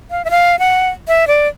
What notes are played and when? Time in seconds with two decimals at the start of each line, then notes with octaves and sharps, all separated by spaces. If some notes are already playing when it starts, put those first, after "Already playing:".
0.11 F5
0.25 E5
0.31 F5
0.59 F#5
1.08 E5
1.27 D5